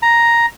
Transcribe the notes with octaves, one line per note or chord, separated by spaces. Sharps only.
A#5